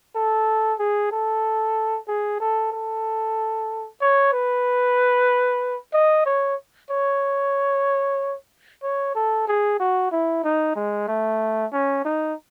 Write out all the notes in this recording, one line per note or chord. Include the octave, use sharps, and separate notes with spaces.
A4
G#4
A4
G#4
A4
A4
C#5
B4
D#5
C#5
C#5
C#5
A4
G#4
F#4
E4
D#4
G#3
A3
C#4
D#4